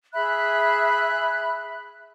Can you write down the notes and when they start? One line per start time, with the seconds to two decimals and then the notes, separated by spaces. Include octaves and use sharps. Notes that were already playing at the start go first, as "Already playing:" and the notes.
0.13 G#4 E5 B5 F#6